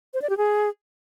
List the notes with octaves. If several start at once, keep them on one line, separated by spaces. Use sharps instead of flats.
C5
D5
G4
G#4